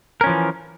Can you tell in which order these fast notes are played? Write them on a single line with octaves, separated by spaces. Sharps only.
A#4 C#4 F3 E3